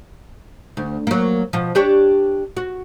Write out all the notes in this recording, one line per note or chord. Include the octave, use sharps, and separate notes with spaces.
D2
F#3 A#3
B2 F3
D4 G4 C#5
F#4